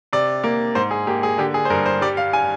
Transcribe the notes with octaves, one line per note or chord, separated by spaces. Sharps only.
C3 D5
A#3
G#2 C5
G#4
A#3 G4
G#4
D3 G4
G#4
C5
G2 A#4
C5
G3 D5
F5
G#5